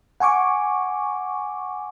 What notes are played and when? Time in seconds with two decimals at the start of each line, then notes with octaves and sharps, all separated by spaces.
0.20 F#5 G#5 C#6 D6